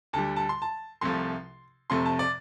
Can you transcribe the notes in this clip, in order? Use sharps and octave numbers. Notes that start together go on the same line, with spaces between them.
D2 D3 G3 A5
A5
C6
A5
C2 C3 F3 A3 C6
F1 F2 C3 A3 C6
A5
D5